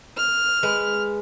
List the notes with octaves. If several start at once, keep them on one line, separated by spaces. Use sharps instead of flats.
F6
G#3 B4